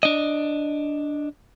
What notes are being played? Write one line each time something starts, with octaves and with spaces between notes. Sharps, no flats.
D4 D#5